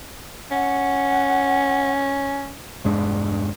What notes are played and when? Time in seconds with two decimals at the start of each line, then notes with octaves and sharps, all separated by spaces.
0.51 C#4 F#5
2.84 E1 G2 G#3 D4